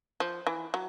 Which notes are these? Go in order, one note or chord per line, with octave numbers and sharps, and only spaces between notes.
F3
E3
F#3